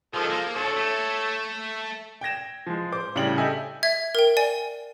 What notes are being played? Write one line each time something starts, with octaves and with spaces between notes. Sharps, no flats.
D#3 F3 G#3 A4
A#3
D4 F#4 A4 C#5
A3
G5 G#6 A#6 E7
F3 G#3
C5 D6
A2 C#3 G3 D4 G5 F#7
G4 A4 D#5 E5 G#5
E5 G#6
A#4 G5
D5 G#5